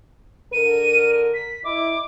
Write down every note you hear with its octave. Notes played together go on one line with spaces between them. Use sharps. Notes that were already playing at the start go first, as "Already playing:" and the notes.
D3 A#4 D#7
B6
E4 D#5 D6